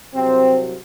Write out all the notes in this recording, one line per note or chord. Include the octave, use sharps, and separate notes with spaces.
C2 C3 F#3 C4